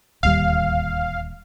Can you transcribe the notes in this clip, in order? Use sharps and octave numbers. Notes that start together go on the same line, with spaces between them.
D1 D#2 G3 F5